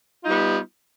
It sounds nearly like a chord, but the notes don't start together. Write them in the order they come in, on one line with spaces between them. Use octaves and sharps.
F4 D#4 G3 B3